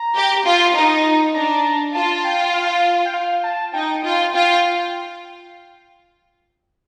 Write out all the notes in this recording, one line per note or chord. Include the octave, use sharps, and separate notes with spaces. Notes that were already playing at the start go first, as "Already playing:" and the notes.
Already playing: A#5
G4
F4
C6
D#4 A#5
D4 A#5
F4 A5
G5
F5
G5
F5
A5
D#4 G5
F4
F4 G5